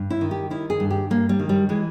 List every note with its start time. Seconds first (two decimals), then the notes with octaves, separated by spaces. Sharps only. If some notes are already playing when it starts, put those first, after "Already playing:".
Already playing: G2
0.10 E4
0.21 D#3
0.31 G4
0.50 D#3 E4
0.70 G#4
0.80 G2
0.90 G4
1.10 G2 A#3
1.29 G3
1.39 D#3
1.49 G3
1.69 E3 G#3